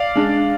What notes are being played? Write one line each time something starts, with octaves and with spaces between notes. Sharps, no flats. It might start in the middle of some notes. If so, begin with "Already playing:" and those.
Already playing: D5 F5
G#3 D4